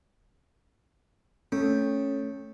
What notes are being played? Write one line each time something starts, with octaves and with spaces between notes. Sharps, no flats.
A3 C#4